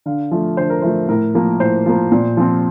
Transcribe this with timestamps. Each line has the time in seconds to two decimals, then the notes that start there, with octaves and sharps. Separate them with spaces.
0.06 D3 F5
0.31 F3 A3
0.57 D3 C5
0.70 A#4
0.82 F3 A3 C5
1.09 A2 A#4
1.35 F3 A#3
1.60 A2 C5
1.86 F3 A#3
2.12 A#2
2.37 F3 C4